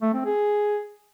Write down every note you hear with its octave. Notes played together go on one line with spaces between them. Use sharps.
A3
C4
G#4